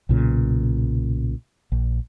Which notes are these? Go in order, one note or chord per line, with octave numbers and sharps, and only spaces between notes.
B1 A#2 C#3
A#1